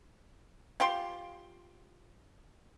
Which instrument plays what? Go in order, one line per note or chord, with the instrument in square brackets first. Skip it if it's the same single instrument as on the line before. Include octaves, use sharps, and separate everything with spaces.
[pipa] F4 G4 C6